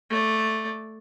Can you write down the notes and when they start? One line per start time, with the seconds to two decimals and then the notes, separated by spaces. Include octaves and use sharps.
0.10 A3 D5